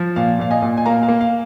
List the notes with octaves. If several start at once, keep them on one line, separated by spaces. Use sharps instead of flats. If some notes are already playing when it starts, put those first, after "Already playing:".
Already playing: F3
A#2 F5
A#2 F5
D#5 G#5
A#2
G#5
A#3 F5 A#5
F5
A#3
F5